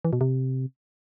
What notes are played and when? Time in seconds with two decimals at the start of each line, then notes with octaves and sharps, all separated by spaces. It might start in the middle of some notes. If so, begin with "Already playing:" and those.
0.05 E3
0.13 B2
0.21 C3